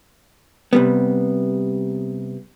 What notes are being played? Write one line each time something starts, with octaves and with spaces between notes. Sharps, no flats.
C3 G3 B3